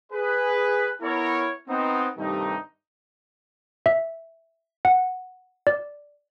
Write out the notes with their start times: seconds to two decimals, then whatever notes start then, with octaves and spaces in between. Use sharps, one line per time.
0.13 G#4 B4
1.02 B3 E4 A#4 C#5
1.69 B3 C4 D#4
2.18 G2 C3 D#3 G3 A3 D#4
3.86 E5
4.85 F#5
5.67 D5